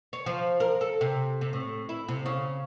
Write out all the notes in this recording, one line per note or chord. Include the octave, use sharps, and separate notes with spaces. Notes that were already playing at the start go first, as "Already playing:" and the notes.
C#5
F3
A#4
A4
C3
C3
A2
E4
C3
C#3